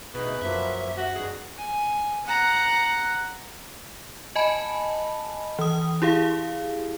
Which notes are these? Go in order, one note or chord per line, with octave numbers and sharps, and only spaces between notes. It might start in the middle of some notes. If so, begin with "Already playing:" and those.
D2 B2 D#4 G#4 B4
F#2 F3 F#3 A#3 E5
F#4
E3 G3 D#4 G#4
G#5
F#5 A#5
D#5 G#5 A5 B5
E3 D#6
E4 G4 G#4 F5